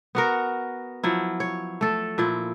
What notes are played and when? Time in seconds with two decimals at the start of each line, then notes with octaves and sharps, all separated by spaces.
0.15 B3 F#4 A#4
1.04 F3 F#3 E4
1.40 C#5
1.81 A3 A4
2.18 A#2 F3 E4